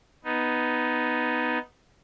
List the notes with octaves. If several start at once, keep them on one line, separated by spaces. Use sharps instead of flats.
B3 D#4